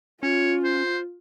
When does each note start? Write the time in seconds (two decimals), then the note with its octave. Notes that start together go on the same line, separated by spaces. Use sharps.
0.23 C#4 F4 C#5
0.64 C5